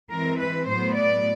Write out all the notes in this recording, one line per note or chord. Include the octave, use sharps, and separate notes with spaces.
E3 G#3 C4 A#4
B4
A2 F#3 B3 C5
D5